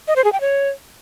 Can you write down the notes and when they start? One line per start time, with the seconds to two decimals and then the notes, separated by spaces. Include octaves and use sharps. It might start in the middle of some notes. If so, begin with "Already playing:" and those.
0.08 D#5
0.16 C5
0.24 G#4
0.33 G5
0.41 C#5